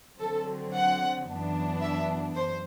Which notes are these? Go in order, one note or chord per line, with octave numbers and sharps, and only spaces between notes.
D3 F#3 C4 A4
F#5
F#2 E3 B3 D4
E5
F#2 C5